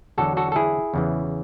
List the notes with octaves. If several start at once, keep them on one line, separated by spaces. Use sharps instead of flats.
E2 D3 F#3 F#4 A4
F#4 A4
A4
E4 G#4
E2 C#3 E3